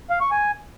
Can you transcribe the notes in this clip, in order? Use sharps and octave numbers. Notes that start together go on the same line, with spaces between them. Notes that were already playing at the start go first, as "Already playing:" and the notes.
F5
C#6
G#5